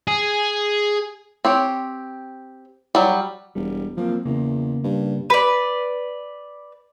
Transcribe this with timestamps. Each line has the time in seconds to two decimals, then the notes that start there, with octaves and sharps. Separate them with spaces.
0.07 G#4
1.45 C4 G4 C#5
2.95 F#3 G3
3.55 E1 G3
3.97 F3 F#3 A#3 C4
4.25 E2 C#3 A#3
4.84 G2
5.30 B4 D5